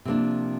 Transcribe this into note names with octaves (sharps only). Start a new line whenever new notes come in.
C3 F3 A#3 D4